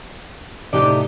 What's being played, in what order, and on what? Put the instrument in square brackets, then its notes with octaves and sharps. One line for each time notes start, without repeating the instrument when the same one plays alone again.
[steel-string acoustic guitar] A2 C3 D#4 [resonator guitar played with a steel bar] G4 D5